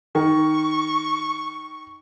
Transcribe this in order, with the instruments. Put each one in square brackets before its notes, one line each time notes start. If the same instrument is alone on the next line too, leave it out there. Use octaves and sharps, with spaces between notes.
[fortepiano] D#3 [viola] C#6